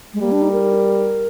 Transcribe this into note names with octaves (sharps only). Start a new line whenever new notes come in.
G#3
G3 A#3
D4
D#4
A#4